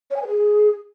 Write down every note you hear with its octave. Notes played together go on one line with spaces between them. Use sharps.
C#5
G#5
B4
G#4